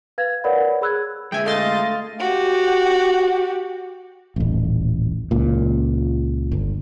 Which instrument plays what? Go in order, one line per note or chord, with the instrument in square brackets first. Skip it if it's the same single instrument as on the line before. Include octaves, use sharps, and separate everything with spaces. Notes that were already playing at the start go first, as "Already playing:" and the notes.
[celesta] B4 F5 G#6 A6
A#4 B4 C#5 D5 F#5 B5
G#4 B5 E6 F#6 G#6
[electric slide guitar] D3 G#3 [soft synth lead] E5 [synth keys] G5 G#5
[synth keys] A3 C6 A6 [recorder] D#5 [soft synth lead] F5
[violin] F#4 G4
[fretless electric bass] D#1 A1
C#2 A#2
G1